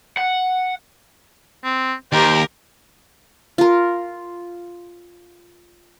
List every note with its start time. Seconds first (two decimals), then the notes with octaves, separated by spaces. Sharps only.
0.17 F#5
1.64 C4
2.13 D#2 G4 A#4 C5 A#5
3.58 F4 A#4